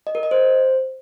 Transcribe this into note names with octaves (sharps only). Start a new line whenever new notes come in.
D#5
A#4
D#5
C5